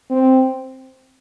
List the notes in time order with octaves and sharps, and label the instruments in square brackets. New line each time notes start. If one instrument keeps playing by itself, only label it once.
[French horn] C4